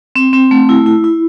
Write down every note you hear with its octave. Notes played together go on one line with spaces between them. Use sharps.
C4
C4
A3
E4
E4
E4